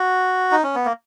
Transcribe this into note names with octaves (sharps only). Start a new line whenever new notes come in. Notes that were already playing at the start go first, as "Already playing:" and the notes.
Already playing: F#4
D#4
C#4
B3
A#3